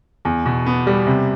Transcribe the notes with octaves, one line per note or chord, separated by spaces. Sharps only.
E2
B2
B3
G3
C3